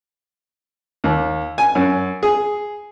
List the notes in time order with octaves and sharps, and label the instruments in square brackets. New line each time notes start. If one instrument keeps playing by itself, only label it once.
[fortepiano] D#2
G#5
F#2
G#4